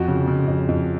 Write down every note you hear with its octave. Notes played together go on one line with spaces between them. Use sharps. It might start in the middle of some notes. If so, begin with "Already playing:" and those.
Already playing: F2 F#4
C#3
C#3
F2
F2